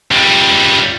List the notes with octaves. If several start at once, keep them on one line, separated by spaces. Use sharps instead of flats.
C#2 G3